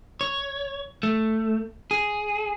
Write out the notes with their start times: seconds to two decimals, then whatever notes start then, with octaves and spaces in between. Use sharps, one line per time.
0.21 C#5
1.03 A3
1.91 G#4